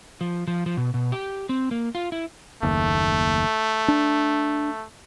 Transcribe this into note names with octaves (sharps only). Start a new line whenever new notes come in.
F3
F3
F3
B2
B2
G4
C4
A#3
F4
E4
F#1 D#2 A3
D4